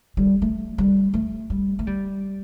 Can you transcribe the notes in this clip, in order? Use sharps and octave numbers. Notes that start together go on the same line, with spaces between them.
G3
A3
G3
A3
G3
A3
G3